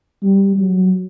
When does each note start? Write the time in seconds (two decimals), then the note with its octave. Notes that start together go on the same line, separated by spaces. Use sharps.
0.23 G3
0.57 F#3